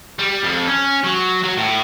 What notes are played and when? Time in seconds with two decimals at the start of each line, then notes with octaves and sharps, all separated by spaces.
0.19 G3
0.44 F2
0.67 C#4
1.04 F#3
1.43 F#3
1.57 A2